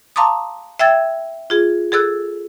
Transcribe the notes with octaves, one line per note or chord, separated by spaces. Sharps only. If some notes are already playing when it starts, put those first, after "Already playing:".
F5 A5 A#5 C6 D6 D#6
E5 G5 E6 G#6 A6
F4 G#4
G#4 A4 E6 F#6